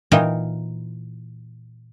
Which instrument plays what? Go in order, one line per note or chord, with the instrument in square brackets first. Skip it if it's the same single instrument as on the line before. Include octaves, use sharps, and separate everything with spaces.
[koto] A#2 E3 D#4 A#4 G5